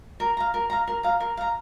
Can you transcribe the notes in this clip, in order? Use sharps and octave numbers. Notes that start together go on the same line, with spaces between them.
A#4
F5 A#5
A#4
F5 A#5
A#4
F5 A#5
A#4
F5 A#5